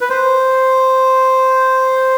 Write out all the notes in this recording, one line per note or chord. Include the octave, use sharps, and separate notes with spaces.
B4
C5